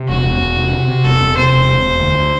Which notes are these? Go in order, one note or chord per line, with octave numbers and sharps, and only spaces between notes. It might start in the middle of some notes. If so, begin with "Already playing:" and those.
Already playing: C3
E1 F#4
E1
E1
C3
C3
C3
E1 A4
E1
C3 C5
E1
E1
E1
D2